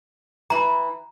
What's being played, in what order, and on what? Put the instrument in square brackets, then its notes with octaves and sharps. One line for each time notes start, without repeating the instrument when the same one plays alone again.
[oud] E3 E4 [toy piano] A#5